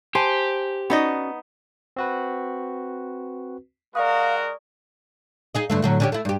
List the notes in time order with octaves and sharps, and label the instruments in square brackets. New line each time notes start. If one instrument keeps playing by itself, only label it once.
[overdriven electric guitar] G4 [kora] C5 [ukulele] G#5 A5 B5
[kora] B3 D#4 D#5 [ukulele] C#4 F#4 D5
[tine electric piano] C4 F#4 B4
[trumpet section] G#3 F#4 A#4 [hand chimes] D5 C#6 D#6 [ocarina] F5
[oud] D#4 G#4 D#5
G2 D3 A3
A2 D3 F#3
D3 C#4 G4
A3 E4
G2 G4